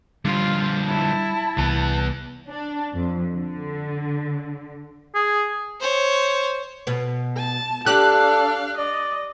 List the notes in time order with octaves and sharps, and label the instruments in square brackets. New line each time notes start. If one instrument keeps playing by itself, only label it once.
[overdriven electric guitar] D3 F3 [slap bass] G3 [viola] F4
[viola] E4 [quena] A5
[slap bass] C2 [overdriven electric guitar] E3 B3
[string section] D4
F2
D3
[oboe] G#4
[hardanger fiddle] C5 C#5
[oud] B2 B3
[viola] A5
[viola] D4 F5 [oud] G4 [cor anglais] A4 [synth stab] F#6
[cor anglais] D5 [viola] D#5